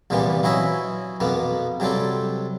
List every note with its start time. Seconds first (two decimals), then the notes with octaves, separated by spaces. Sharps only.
0.10 C2 A#2 E3 F3 G3 B3
0.43 E3 F#3 C#4 E4 D#5 E5
1.20 F2 B2 A#3 B3
1.80 C3 F#3 G3 C4 A4